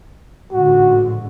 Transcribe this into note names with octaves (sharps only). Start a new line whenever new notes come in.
A1 G#2 D3 F#4